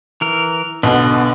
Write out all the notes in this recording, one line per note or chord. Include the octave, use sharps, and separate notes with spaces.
E3 A#4
B1 B2 D3 B3